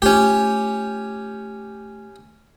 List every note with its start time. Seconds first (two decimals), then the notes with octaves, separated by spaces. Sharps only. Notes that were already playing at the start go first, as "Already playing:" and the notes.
0.02 A3 C#4 F4 G4